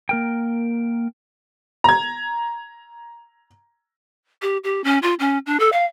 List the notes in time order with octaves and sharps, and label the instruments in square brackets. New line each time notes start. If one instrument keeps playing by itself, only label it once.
[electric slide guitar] A#3 A#4 G5
[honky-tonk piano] A#5 G#6
[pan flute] G4
G4
C#4
F4
C#4
D4
A4
F5